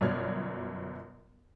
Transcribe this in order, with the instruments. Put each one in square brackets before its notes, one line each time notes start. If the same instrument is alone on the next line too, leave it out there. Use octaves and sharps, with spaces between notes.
[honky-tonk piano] G1 F#2 B2 C#5 D5 F6